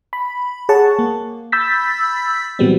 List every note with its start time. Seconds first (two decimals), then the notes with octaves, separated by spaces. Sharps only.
0.13 B5
0.69 G#4 C#5 F#5 A5 C#6
0.99 A#3
1.52 B5 E6 G6 A6 B6
2.59 A#2 E3 F#3 G3 B3 C4